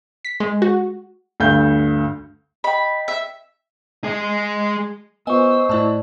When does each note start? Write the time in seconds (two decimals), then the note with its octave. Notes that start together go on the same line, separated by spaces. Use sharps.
0.25 B6
0.40 G#3
0.62 F#4
1.40 D2 G2 F5 G6
2.64 D#5 G5 B5
3.08 E5
4.04 G#3 G#4
5.27 B3 F4 C5 D#5 G#5 C#6 E6
5.69 A2 E4 D5 A5